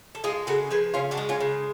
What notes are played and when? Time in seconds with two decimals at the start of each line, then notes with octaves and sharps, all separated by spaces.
0.15 A4
0.24 G#3 F4 G#4
0.47 C#3 F#4 A4
0.70 F3 G#4 B4
0.94 C#3 C#4 F4
1.11 D4 F#4
1.17 G#3
1.29 C#4 F4
1.40 C#3